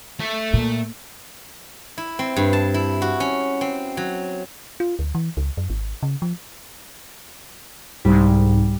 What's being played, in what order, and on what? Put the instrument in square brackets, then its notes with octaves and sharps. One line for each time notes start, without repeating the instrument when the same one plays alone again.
[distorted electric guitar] A3 E5
[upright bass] A#2
[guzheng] E4
C4
G2
A5
E4
F#4
C#4
C4
F#3
[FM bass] F4
D2
E3
C#2
F#2
G#1
C#3
F3
[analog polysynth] C2 G#2 [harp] G3